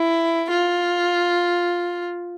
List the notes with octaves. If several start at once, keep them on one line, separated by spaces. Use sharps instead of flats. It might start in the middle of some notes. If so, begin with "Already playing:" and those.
Already playing: E4
F4